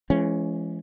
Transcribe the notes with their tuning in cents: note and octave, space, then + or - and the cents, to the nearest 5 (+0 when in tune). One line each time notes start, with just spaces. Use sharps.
E3 +45 G#3 +25 C#4 +0